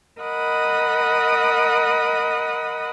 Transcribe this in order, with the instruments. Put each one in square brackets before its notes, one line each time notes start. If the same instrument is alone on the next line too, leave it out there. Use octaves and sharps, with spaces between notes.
[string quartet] A#4 D#5 F#5 B5 D#6